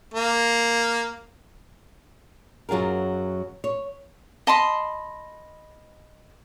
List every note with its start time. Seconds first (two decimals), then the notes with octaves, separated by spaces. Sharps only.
0.14 A#3
2.69 F#2 F#3 F4 G#4 A#4
3.64 C#5
4.47 D#5 A5 B5 C6